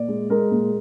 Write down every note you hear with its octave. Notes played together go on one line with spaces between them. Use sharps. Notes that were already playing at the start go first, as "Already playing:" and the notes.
Already playing: A#2 D5
G#3
G#3 A#4
A#2